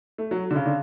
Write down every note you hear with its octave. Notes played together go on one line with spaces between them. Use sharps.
A3
F#3
D3
C#3
D3